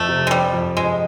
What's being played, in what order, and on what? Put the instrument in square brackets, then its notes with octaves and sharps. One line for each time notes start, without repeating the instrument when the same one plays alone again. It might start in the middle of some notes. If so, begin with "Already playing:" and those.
Already playing: [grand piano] F2 [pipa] A3
[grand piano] C3
[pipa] G#3
[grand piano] F3 [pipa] G3
[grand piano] F2
[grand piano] F2 [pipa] G#3